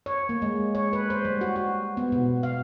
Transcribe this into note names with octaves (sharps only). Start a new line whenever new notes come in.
C#5
A#3
G#3
C#5
B4
C5
G3
F#4
F#4
B3
B2
F5